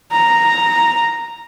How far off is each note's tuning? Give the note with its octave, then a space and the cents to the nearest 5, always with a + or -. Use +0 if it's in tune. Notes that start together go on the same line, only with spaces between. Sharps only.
A#5 -5